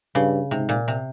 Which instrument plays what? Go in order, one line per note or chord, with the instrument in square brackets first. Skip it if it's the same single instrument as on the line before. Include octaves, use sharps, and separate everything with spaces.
[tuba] G2 [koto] C#3
[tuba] G#2 [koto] C3
[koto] A#2
C3